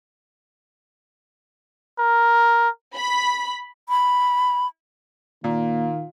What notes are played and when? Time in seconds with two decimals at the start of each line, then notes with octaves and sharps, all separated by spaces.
1.99 A#4
2.96 B5
3.89 B5
5.44 A#2 D#3 A#3 F4